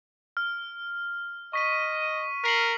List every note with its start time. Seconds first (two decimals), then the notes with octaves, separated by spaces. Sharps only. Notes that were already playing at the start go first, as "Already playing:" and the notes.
0.37 F6
1.53 D#5 C#6 B6 D#7
2.44 A#4 B6 C7 F#7